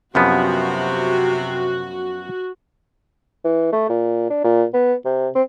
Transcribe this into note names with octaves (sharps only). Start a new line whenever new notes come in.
F#2 C3 F3 B3 F#4
E3
A3
A#2
D4
A#2
B3
C3
C4